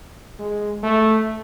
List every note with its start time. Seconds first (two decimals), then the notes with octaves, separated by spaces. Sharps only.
0.39 G#3
0.83 A3